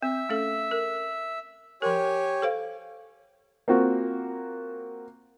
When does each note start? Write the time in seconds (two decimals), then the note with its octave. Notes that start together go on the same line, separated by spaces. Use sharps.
0.03 C4 E5
0.29 A3 C#4 A4
0.71 A#4
1.82 F3 G4 A#4 C#5 G#5
2.42 A4 C5 F5
3.68 A#3 C4 F4 F#4